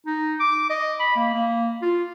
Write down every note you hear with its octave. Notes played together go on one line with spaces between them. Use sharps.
D#4
D6
D#5
B5
A#3
A#3
F4